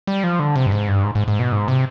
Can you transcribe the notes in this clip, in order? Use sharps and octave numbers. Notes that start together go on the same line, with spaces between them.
G3
F3
D3
C3
G2
G#2
G2
G#2
G#2
G#2
B2
G#2
C3